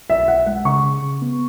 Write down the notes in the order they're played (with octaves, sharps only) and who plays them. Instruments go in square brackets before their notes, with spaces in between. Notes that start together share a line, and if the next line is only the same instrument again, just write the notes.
[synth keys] B1 [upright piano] E5
[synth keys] B1 [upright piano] F#5
[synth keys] G#3 [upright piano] F#5
[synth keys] C#3 [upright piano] C#6
[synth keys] C#3
C#3
B3